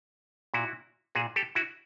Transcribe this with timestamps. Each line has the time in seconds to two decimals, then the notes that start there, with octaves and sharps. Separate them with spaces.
0.54 A#2 E4 F#4
1.15 A#2 F#4 G#4
1.36 G4 A4
1.55 E4 F#4